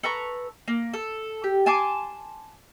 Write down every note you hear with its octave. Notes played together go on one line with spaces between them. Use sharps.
A4 B4 A#5 C#6
A#3
A4
G4
G#5 A5 C6 D6